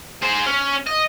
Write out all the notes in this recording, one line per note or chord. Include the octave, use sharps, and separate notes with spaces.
G#4 C5
C#4
D#5